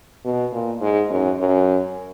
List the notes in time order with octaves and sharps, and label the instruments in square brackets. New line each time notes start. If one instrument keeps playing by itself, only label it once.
[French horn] B2
A#2
G#2
F#2
F#2